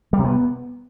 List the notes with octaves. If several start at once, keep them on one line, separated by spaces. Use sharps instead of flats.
G3
C3
B3